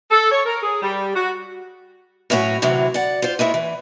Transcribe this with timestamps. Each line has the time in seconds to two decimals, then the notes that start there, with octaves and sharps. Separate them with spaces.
0.11 A4
0.31 C#5
0.45 A#4
0.62 G#4
0.82 G3
1.15 F#4
2.30 A2 F#3 C#4 F#4 C#5
2.62 D2 A2 C3 E3 F#3
2.94 D5 F#5
3.22 F4 C5
3.39 G#3 A#3 E4 C#5
3.54 E3